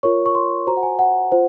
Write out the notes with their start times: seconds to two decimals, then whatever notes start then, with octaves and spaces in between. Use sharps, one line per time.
0.03 F4 A#4 C#5 C#6
0.26 C#6
0.35 C6
0.67 F#4 C5 A#5
0.77 F#5
0.83 G#5
0.99 F#5
1.32 F4 C5